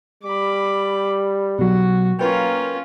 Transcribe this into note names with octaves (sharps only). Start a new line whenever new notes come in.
G3 B5 D6
B2 F#3 F#4
A#3 C#4 F4 A#4 B4 G5